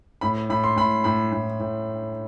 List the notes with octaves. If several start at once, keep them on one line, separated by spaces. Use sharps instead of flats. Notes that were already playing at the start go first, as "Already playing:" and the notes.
A2 B5
A2 B5
C6
A2 B5
A2 B5
A2
A2